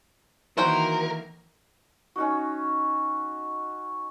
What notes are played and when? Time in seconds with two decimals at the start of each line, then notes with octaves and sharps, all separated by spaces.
0.58 D#3 E3 A#3 F#4 A#4 C5 G5
2.16 C#4 D#4 F#4